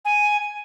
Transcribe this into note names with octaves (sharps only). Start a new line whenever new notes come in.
G#5